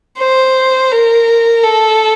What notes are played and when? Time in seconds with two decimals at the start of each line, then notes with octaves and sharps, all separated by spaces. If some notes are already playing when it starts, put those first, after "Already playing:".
0.18 C5
0.92 A#4
1.63 A4